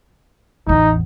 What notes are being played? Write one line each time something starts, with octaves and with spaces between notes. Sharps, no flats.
A1 E2 D#4